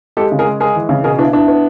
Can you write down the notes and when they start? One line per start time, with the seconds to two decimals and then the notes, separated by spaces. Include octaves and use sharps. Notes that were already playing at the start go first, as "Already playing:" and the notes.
0.17 G#3 G4 A4
0.32 C#3
0.39 G#4 A#4
0.46 G#3
0.60 G#3 G#4 A#4
0.75 E3
0.89 C#3
1.04 B2 G#4 A#4
1.18 B3 D4 E4
1.33 B3 D4 E4
1.48 B3